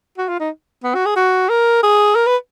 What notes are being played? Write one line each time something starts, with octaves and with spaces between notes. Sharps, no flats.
F#4
F4
D#4
B3
F#4
G#4
F#4
A#4
G#4
A#4
B4